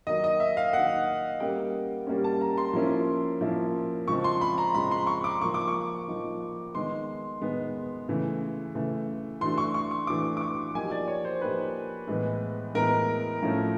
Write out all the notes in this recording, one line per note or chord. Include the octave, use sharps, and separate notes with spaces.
D#3 F#3 A#3 D#5
D#5
E5
F5
D#3 F#3 A#3 F#5
G3 A#3 C#4 G5
G3 A#3 C#4
A5
A#5
C6
F3 A#3 C#4 E4
F3 A#3 C#4 E4
C#3 F3 G#3 C4 C#6
C6
B5
A#5
C#3 F3 G#3 C4 B5
C6
C#6
D6
F3 A#3 D#4 C#6
D6
C#6
F3 A#3 D#4
D#3 G#3 B3 C6
D#3 G#3 B3
C#3 E3 A3
C#3 E3 A3
E3 A3 D4 F#4 C6
C#6
C#6
C#6
E3 A3 D4 F#4 D6
D6
C#6
F3 A#3 D#4 G4 G#5
D5
C#5
C5
F3 A#3 D#4 G4 B4
A2 E3 G#3 B3
A2 E3 G#3 B3 A#4
A2 F3 A3 C#4